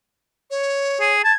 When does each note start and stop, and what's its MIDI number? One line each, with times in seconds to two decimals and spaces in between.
0.50 1.12 73
1.01 1.21 68
1.24 1.32 81
1.24 1.36 92